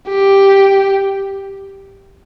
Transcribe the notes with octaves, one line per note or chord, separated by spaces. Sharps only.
G4